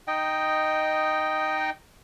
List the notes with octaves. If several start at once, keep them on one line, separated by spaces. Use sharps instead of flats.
D#4 D#5 G5